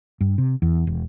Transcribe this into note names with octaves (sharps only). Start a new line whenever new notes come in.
G2
C3
E2
E1